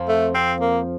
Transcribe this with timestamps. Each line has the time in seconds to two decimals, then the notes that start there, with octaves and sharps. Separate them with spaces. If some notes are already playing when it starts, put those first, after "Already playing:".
Already playing: F2 F3
0.09 A3
0.35 C4
0.61 A#3